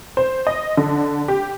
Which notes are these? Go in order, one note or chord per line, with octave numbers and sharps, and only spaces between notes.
C5
D#5
D3
G4